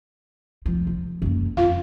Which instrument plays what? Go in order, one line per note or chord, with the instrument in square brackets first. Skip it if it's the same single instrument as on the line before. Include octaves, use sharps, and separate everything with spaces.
[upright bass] F1 F3
F3
F#2 A#3
[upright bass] F2 [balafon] F4 F5